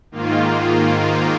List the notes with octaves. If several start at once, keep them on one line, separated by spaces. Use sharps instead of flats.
G#2 D#3 A#3 F4